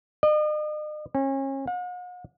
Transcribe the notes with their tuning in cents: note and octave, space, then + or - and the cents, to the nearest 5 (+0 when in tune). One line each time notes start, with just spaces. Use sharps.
D#5 -45
C#4 -35
F#5 -45